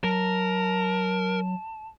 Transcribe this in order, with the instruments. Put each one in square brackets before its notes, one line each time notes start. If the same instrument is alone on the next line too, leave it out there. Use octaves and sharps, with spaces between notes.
[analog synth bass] F#3 [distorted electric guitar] A#4 [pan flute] A5